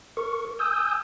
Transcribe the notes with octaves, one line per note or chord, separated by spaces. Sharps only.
A#4 C#6
G#5 D#6 E6 G6